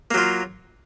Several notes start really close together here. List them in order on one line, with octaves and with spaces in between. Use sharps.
A#3 F#3 F4